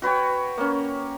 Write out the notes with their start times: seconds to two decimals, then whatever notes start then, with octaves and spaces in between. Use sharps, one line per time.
0.02 F#4 B4 C#5 G5
0.58 A#3 C#4